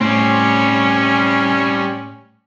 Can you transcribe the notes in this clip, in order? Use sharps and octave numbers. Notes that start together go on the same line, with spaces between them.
A2 G3 C4 C#4